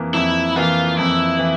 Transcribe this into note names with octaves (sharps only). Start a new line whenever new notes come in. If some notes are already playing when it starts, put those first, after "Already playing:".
Already playing: F2 E3 A#3
F2 E4
E3 A#3 F4
F2 E4
E3